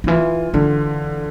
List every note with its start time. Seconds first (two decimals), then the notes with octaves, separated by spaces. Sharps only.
0.04 D3
0.07 E3 F4
0.54 D3 E3